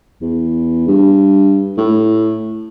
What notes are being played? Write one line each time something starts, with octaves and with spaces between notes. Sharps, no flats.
E2
G2
A2